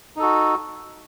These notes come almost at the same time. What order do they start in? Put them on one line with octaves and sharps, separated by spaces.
D#4 A4 F#4